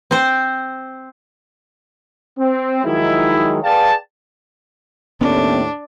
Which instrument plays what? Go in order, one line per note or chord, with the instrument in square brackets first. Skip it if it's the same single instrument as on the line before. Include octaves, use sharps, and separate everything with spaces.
[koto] C4 C5
[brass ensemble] C4
D#3 F3 F#3 G#3 D#4 E4
G#4 B4 D5 F5 G5 A5
[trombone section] D#2 A2 [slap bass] B3 C#4 [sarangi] D4